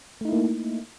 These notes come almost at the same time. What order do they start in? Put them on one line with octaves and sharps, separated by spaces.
A3 D#4 E4 A#3